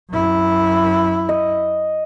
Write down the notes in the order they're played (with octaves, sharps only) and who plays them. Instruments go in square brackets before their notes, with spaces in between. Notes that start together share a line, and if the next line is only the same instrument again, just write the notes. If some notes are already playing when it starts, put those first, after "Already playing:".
[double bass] F#2 E4
[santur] D#5